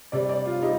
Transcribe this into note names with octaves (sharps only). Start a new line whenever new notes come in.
C3 G3 D5
D5
F4
G3 D#4